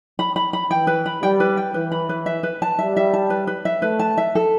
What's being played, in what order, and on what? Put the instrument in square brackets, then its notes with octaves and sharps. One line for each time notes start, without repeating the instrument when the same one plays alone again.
[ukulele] B5
B5
B5
[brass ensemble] E3 [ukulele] G5
[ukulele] B4
B5
[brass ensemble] G3 [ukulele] G5
[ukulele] B4
G5
[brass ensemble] E3 [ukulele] B4
[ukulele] B5
B4
E5
B4
A5
[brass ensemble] G3 [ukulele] E5
[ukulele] E5
A5
B4
B4
E5
[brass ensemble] A3 [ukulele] B4
[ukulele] A5
E5
A4